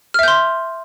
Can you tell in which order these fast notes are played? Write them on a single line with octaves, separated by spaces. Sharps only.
F6 E5 G6 C6